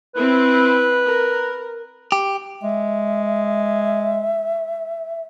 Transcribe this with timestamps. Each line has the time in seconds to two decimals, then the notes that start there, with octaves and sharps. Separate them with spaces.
0.15 C4 E4 B4
1.06 A#4
2.12 G4
2.63 G#3 E5